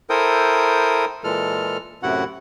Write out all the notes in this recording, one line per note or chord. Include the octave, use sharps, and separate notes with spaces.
E4 A4 A#4 C5 G5 D#6
A#2 E3 G#3 A4 F6
F#2 A2 C3 E4 F#4 F#5